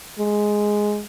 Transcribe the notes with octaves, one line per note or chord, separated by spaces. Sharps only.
G#3